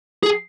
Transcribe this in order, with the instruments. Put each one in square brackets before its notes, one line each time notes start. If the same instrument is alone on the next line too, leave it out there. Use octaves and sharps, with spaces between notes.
[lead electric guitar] G#4